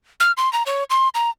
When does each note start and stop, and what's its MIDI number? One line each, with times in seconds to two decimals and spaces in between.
0.20 0.32 89
0.37 0.51 84
0.53 0.63 82
0.66 0.84 73
0.90 1.09 84
1.15 1.30 82